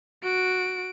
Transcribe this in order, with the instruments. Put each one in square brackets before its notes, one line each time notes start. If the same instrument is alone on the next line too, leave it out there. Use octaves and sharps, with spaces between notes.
[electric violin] F#4 D7